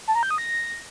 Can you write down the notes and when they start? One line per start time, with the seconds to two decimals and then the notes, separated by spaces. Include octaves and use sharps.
0.08 A5
0.15 A#5
0.23 G6
0.31 D#6
0.38 A#6